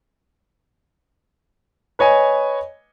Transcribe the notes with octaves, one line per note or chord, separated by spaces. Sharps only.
B4 C#5 D#5 G#5